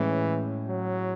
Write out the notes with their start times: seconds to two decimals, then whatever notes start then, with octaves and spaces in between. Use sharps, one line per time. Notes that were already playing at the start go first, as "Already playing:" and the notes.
Already playing: A2 E3 G#3 C#4
0.68 F#3